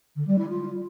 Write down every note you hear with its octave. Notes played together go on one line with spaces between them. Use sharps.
D3
G3
E4
F4